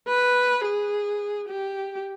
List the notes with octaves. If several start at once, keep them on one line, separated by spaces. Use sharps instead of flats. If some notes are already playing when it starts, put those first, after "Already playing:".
B4
G#4
G4